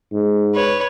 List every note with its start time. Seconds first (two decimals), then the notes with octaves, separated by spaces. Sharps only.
0.12 G#2
0.55 B4 C#5